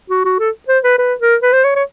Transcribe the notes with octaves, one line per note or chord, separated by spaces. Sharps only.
F#4
F#4
A4
C5
B4
B4
A#4
B4
C5
C#5
C#5